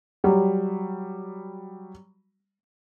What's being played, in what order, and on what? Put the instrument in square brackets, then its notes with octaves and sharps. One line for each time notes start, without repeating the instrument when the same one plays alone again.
[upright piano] F#3 G3